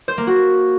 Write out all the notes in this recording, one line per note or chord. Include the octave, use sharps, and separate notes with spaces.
C5
A#3
F#4